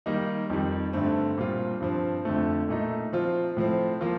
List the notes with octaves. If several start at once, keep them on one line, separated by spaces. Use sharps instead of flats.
D#3 G3 A#3 D#4
F2 D#3 G3
G2 D3 A3 C4
A#2 G3 C4 F4
G2 F3 C4
F2 D3 A3
A#2 A3 D#4
F3 C4 F4
A2 F3 C4
F3 A#3 F4